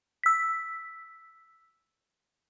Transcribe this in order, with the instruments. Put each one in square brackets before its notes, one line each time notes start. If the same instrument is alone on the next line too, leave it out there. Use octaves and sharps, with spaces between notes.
[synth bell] E6 B6